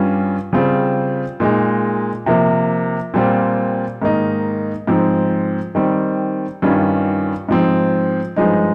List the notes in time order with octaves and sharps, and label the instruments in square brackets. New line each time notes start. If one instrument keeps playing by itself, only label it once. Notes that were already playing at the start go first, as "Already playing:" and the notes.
Already playing: [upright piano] G2 G3 C#4 F4
C#3 G3 C4 F4
A#2 G#3 D#4
C3 F3 A#3
A#2 G3 C4 F4
G#2 D#3 A#3 D#4
G#2 F3 C4
D#3 G3 C4
G2 D#3 G3 C#4 F4
G#2 F3 C4
G2 F3 G#3 D#4